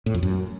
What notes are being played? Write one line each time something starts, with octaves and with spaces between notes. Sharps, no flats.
A2
F2
F#2